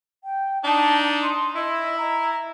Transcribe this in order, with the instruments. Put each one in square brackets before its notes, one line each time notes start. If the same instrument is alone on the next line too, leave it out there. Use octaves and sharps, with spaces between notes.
[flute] G5
[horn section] D4 D#4 [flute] A5
[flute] C6
[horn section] E4 [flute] D#5
[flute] A#5